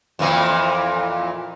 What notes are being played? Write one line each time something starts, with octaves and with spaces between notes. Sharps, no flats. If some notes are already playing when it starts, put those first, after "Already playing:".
F2 A#2 E3